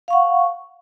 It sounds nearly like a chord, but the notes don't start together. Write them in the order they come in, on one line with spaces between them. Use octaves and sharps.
F5 C#6 F#5